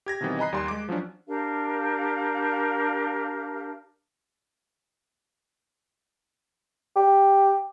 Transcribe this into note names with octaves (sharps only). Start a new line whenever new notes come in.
G4 G#6 A#6
B2 D#3 E3 G3 B3 C4
D#5 G#5 A#5 B5 F#6 C7
D#2 G3 D5 G#5 C6
G#3 D6
F3 F#3 C#4 D4
D4 G4 A#4 F5
G4